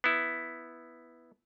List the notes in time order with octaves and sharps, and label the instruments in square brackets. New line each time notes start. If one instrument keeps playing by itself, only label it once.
[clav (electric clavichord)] B3 E4